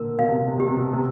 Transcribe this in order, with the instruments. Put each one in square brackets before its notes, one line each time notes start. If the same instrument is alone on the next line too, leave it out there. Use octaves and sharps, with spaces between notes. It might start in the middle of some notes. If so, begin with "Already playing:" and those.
Already playing: [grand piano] A#2 D3 [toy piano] A#4
[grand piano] B2 [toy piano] F5
[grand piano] C3
B2
C3
[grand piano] B2 [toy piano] G4
[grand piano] C3
B2
C3